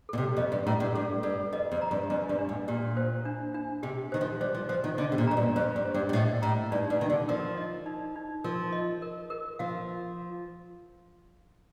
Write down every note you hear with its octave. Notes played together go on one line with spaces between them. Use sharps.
A#2 A4
C3
F2 D#5
G2
A2 A#5
G2
G2 A4
G2 A4
F2 D#5
F2
A#5
G2
F2 D4
G2
D4
A2
A#2 G4
C5
D4
D4
C3 G4
D#3 C5
F3
G3 C5
F3
F3 C5
D#3
D3 D#5
C3
A#2
F2 A#5
G2
F2 C5
G2
C5
G2
A#2
A2 D#5
A2 A#5
G2 D#4
G2
D#3 D#4
D3
F3 A#4
D#5
D#4
D#4
F3 A#4
D#5
A#4
A#4
F3 F5